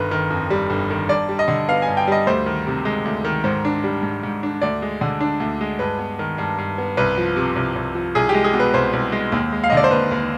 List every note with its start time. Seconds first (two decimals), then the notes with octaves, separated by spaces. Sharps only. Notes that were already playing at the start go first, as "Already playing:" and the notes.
Already playing: G1 D#3 B4
0.11 D#3
0.30 F2
0.50 G3
0.70 G1
0.90 D#3
1.09 G2 D5
1.28 G3
1.39 D#5
1.48 D3
1.69 B3 F5
1.82 G#5
1.88 G2
1.97 G5
2.07 G3 D#5
2.27 D2 C5
2.46 D#3
2.67 C3
2.85 G#3
3.05 D2
3.25 D#3
3.44 G#2 C5
3.65 D4
3.84 G3
4.03 G#2
4.23 G#2
4.43 D4
4.62 D2 D5
4.82 G#3
5.01 D3
5.21 D4
5.40 D2
5.61 G#3
5.79 G2 B4
5.99 B3
6.19 D#3
6.38 G2
6.58 G2
6.78 B3
6.97 C2 B4
7.18 F3
7.36 C3
7.56 C2
7.75 C2
7.95 F3
8.15 C2 G#4
8.29 G4
8.34 G#3
8.44 G#4
8.54 B2
8.60 B4
8.74 C2 C5
8.93 C2
9.12 G#3
9.32 D#2
9.52 G#3
9.64 F5
9.70 D#5
9.72 D3 D5
9.84 C5
9.91 D#2 B4
10.11 D#2